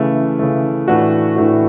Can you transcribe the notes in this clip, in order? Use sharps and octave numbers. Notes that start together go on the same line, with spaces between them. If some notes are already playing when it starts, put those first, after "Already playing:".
Already playing: C#3 E3 A3
C#3 E3 A3
A2 E3 A3 D4 F#4
A2 E3 A3 D4 F#4